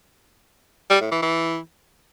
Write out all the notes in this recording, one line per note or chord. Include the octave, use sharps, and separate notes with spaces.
G3
A2
E3
E3